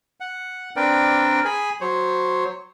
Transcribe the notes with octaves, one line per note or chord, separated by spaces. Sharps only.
F#5
C4 D4 A#4 B4 D5 G5
G#4 G#5 B5
F#3 C5 C#5